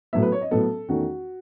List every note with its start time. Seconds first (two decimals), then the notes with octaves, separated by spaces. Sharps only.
0.13 A2 F#3 B3 E5
0.22 B4
0.32 C#5
0.41 D#5
0.51 A2 F#3 B3 A4
0.89 E2 D#3 A3 C#4 F#4